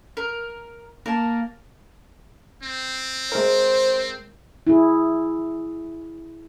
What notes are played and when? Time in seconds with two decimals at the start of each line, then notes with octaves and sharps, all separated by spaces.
0.17 A#4
1.06 A#3 A#4 A5
2.63 C4
3.32 G#3 A#4 C5
4.67 E4 G#4